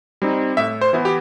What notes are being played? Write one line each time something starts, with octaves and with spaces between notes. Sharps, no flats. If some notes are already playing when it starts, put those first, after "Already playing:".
G3 C4 D#4
A2 E5
C5
E3 B3 E4
G4